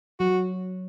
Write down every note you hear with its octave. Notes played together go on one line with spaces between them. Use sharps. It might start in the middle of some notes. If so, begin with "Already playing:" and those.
F#3 F#4